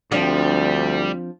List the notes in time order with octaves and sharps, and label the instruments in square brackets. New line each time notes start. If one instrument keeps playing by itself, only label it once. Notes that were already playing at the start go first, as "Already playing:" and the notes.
[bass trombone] D2 [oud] F3 C4 D4 [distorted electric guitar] G3